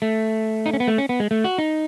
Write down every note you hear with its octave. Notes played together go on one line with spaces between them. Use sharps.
A3
D#4
C#4
B3
A3
C#4
B3
G#3
A3
F#4
D#4